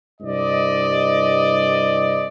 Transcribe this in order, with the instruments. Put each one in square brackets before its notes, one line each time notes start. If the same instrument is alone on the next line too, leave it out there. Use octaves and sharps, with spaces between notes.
[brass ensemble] C2 G2 D5 D#5